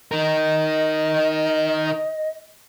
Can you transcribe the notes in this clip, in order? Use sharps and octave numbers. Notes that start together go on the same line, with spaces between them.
D#4 A#4 D#5